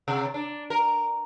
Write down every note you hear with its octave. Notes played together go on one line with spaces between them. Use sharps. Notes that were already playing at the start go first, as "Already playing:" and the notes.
C3
D4
A#4